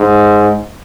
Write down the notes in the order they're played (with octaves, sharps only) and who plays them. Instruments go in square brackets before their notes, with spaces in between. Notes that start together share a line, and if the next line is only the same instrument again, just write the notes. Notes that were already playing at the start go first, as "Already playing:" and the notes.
Already playing: [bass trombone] G#2